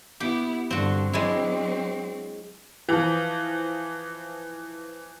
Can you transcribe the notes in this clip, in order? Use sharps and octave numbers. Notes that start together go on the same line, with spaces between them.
B3 E4 G4
G2 D3 C4 F#4
F#3 G#3 C4 D4 E4
E3 F3